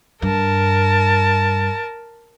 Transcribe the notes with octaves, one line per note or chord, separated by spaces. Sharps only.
G2 A#4 A5